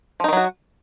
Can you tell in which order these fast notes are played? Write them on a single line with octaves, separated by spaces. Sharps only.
F3 D#4 D#3 F#3 F#4